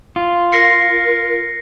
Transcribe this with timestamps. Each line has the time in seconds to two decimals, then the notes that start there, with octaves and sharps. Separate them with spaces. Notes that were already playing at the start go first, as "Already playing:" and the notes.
0.16 F4
0.52 A#4 A#6 C7 C#7